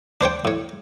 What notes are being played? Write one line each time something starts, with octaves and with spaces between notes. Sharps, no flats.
D4 C5 C#5 G5
A2 C#5